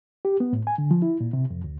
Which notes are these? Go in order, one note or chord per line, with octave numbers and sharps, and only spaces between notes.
G4
B3
A2
G#5
D3
F3
E4
A#2
C3
F2
D2